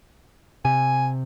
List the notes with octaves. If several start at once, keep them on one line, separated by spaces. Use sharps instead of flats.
C3 G#5